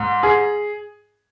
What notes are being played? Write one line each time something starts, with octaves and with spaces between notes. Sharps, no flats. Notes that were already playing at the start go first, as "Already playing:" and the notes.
Already playing: G#2
G#4